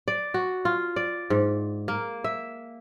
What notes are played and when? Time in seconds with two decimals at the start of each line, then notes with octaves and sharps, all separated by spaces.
0.08 D5
0.34 F#4
0.65 F4
0.96 D5
1.30 G#2
1.88 A#3
2.24 E5